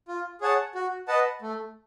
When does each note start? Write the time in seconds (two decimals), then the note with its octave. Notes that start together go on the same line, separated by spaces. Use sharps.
0.08 F4
0.41 G#4 C#5 F#5 A5
0.75 F#4
1.08 B4 D#5 F#5 A5
1.42 A3